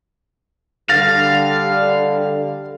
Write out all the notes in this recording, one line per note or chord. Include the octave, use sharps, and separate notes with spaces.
D3 G3 F5 A6 A#6